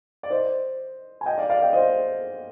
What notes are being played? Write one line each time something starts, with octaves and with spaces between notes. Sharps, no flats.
D5
C5 D#5
G#5
D#5 G5
D5 F5
D5 F5
D#5 G5
C5 D#5